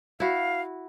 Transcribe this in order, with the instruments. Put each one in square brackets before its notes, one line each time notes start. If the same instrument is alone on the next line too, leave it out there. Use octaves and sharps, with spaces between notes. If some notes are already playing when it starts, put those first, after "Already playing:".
[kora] E4 F#4 [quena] F5